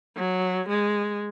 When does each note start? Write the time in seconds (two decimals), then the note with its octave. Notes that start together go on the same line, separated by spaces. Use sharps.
0.17 F#3
0.69 G#3